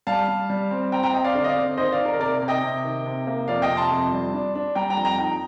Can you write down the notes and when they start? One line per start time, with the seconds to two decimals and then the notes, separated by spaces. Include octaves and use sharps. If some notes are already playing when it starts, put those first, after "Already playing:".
0.07 G3 F5 A5
0.28 G3
0.50 G3
0.71 C4
0.92 C4 G5 A#5
1.03 G5 A#5
1.13 C4 D#5 G5
1.24 D5 F5
1.35 D3 D5 F5
1.44 D#5
1.49 D5 F5
1.56 C4
1.77 D#3 C5 D#5
1.92 D5 F5
2.00 D#3
2.06 A#4 D5
2.20 C3 A#4 D5
2.42 C3
2.48 D#5 G5
2.63 C3
2.84 D#3
3.06 C3
3.27 A#3
3.48 F2 D5 F5
3.62 D#5 G5
3.70 C3
3.77 A5 C6
3.91 F2
4.12 G3
4.34 D4
4.55 D4
4.75 G3 G5 A#5
4.90 G5 A#5
4.97 F2
5.05 G5 A#5
5.18 D#4 G5 A#5